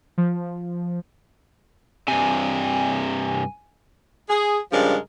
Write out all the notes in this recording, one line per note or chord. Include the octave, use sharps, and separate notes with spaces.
F3
G2 C3 G#5
G#4
G2 C#3 F3 G#3 A#4 D5